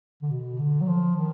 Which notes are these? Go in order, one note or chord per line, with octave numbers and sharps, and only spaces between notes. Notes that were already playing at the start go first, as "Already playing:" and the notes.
D3
B2
D3
F#3
F3
D#3